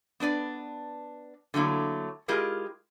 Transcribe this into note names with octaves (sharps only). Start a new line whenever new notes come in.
B3 D4 B4 D5
D3 F#3 A3 A#3 E4
G#3 E4 F4 G4 G#4 A#4